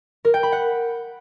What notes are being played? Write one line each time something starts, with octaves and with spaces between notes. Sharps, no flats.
A#4
G5
B5
F#5